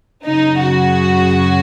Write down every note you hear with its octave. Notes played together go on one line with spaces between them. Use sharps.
F#2 C#3 F#3 D#4
F#4